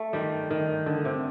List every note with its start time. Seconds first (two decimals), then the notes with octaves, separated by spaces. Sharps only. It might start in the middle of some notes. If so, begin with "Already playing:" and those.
Already playing: A3
0.13 D#3 G3
0.51 D#3
0.86 D3
1.05 C3